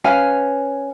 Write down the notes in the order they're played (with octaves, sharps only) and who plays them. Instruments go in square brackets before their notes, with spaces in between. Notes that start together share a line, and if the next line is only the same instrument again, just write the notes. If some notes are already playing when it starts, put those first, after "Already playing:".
[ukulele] C#4 B4 F5 G#5